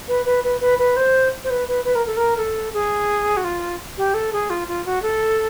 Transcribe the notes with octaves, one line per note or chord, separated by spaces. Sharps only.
B4
B4
B4
B4
B4
C5
C5
B4
B4
B4
A#4
A4
A#4
A4
G#4
F#4
F4
G4
A4
G#4
F4
F4
F#4
A4